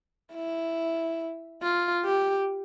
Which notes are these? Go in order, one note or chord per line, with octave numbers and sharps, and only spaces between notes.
E4
F4
G4